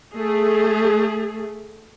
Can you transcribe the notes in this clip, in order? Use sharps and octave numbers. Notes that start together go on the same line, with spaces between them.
A3 G#4